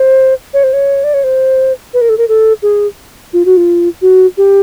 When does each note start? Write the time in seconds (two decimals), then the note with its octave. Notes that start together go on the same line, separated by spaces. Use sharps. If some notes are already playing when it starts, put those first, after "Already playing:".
Already playing: C5
0.54 C#5
0.63 C5
0.73 C#5
1.04 D5
1.14 C#5
1.24 C5
1.94 B4
2.01 A#4
2.09 A4
2.18 A#4
2.29 A4
2.62 G#4
3.33 F4
3.45 F#4
3.57 F4
4.02 F#4
4.37 G4